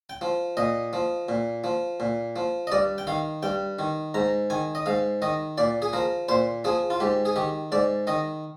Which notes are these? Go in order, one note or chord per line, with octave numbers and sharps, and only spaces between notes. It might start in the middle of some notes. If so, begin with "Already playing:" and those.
G5
F3
A#2 D#5
F3
A#2
F3
A#2
F3
D#5
G2 D5
G5
D#3 F5
G2 G5
D#3
G#2 A#5
D#3 G#5
D#5
G#2 F5
D#3 D#5
A#2 D5
G#4
F3 A#4
A#2 C5
F3 G#4
F4
G#2 G4
G#4
D#3 G4
G#2 D5
D#3 D#5